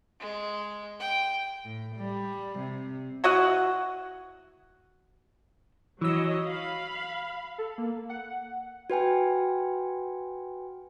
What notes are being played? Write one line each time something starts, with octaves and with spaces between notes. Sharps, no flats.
G#3
G5
A2
G3
C3
E4 F#4 D#5 F#5
E3 F#3 C#5 D#5 E6
F5 B5
A4
A#3
F#5
F#4 B4 G5 G#5